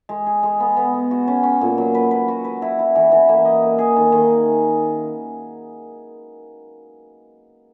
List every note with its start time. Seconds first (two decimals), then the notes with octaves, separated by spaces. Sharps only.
0.09 G#3
0.26 G#4
0.43 G#3
0.60 B3
0.77 B3
0.93 B3
1.11 F#4
1.28 C#4
1.43 C#4
1.61 A#2
1.78 F#3
1.95 B4
2.11 B4
2.28 F#4
2.44 B4
2.62 E4
2.79 E4
2.95 E3
3.12 E3
3.29 A#3
3.45 D#5
3.62 A#3
3.78 G#4
3.96 D#3
4.12 D#3